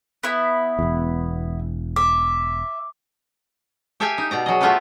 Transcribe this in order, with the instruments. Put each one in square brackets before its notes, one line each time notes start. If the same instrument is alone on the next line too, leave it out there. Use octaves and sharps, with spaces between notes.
[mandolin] B3 E4
[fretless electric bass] E1 E2
[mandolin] E5 [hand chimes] D6
[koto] G4 A4 E5 F5 G5 G#5
D#4
B2 D5 A#5
F#3 G#4 D#5
A3 B3 F4 G4 A4 B4